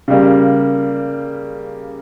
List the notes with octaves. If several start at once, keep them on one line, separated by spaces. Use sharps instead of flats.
C#3 G3 A#3